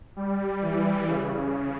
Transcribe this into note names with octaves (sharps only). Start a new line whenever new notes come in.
G3
E3
C#3